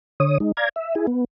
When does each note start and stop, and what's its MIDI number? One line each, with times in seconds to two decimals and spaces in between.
0.20 0.38 50
0.20 0.38 73
0.20 0.38 87
0.40 0.52 56
0.40 0.52 63
0.57 0.69 74
0.57 0.69 77
0.57 0.69 82
0.57 0.69 92
0.76 0.95 76
0.95 1.06 64
0.95 1.06 68
1.07 1.25 59